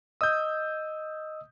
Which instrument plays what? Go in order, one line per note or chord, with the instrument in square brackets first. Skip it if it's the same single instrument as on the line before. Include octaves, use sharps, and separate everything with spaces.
[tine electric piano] D#5 E6 [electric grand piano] D#6 G6